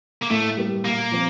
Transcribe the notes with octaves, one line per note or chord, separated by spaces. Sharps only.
A#3
A2 A3
G3 A#3
A#2 A#3
F3 C4